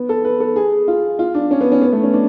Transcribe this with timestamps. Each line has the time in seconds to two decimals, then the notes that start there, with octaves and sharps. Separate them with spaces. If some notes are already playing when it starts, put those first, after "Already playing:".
Already playing: B3
0.09 A4
0.25 B4
0.40 A4
0.56 G#4
0.88 F4
1.19 F4
1.35 D4
1.51 C#4
1.61 B3
1.72 C#4
1.82 B3
1.93 A3
2.03 C#4
2.14 D4